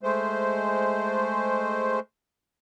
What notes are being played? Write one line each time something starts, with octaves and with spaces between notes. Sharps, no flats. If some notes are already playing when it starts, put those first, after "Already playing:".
G#3 A3 C5